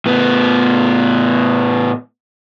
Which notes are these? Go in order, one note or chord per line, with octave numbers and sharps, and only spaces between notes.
A2 B3